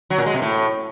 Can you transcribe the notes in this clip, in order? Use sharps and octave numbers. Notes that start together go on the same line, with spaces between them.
F#3
A#2
G#3
C3
A2